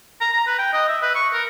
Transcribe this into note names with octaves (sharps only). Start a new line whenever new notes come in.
A#5
A#5
B4
G5
D#5
E5
B4
C#6
A#4